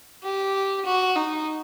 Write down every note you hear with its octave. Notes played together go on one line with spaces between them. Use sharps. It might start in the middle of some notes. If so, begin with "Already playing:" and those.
G4
F#4
D#4